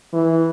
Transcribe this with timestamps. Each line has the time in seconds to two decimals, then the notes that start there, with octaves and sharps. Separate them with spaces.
0.14 E3